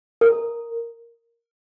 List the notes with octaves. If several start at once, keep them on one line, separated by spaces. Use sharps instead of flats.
A#4